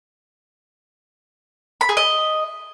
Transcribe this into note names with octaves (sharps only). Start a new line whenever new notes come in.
B5
G#4
D#5